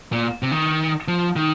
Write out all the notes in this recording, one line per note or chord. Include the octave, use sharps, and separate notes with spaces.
A#2
C3
D#3
F3
D#3